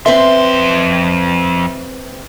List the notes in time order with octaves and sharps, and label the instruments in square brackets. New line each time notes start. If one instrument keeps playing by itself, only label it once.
[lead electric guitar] F2 C6 [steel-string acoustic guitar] C4 B4 E5